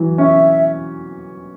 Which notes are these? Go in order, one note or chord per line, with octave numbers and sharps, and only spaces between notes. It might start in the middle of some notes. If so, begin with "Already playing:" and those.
Already playing: E3 F#3
C#4 E5